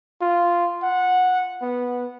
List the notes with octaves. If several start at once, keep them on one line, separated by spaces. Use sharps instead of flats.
F4
F#5
B3